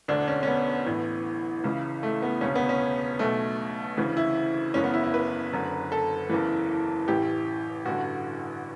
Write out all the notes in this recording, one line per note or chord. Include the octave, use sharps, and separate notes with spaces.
E1 D2 D3 D4
C#4
C#4
B3
A1 A2 E3
C#2 C#3 E3
A3
B3
E1 D2 C#3 C#4
B3
C#4
B1 B2 A3
D2 C#3 E3
E4
F#1 E2 C#3 C#4
B3
E4
E4
B4
F#1 F#2 D3
A4
F#1 E2 C#3 E3
A1 A2 E3 G4
A1 G2 D3 F#4